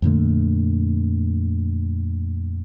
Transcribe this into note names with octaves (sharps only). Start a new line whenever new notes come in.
F2 A#2 D3 A3